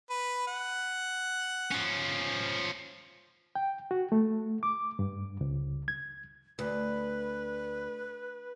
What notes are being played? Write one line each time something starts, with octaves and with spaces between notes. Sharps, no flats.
B4
F#5
F3 C#4
G5
F#4
A3
D6
G2
C#2
G#6
D2 B4